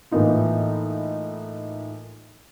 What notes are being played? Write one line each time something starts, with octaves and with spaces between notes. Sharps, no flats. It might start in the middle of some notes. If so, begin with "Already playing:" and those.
A2 E3 A#3 B3 D#4 F4